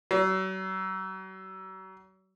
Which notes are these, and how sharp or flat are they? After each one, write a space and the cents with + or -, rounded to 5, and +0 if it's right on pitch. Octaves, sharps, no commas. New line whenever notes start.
F#3 +40